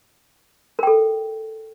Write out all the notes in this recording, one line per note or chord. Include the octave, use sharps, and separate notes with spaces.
A4 A#4 G5